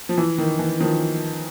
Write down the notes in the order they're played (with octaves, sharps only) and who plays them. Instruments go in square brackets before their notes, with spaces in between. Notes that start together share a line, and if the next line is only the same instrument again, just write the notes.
[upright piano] F3
E3
D#3
E3
D#3 F3